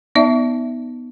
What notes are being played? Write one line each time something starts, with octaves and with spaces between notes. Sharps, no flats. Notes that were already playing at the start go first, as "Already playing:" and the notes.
B3 D#4 D5 E5